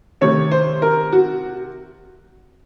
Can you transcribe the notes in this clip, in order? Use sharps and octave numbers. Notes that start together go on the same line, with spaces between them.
C3 D#3 A3 C#5
C5
A#4
F#4